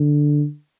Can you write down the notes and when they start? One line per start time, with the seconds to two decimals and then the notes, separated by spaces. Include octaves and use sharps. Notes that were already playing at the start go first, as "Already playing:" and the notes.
Already playing: D3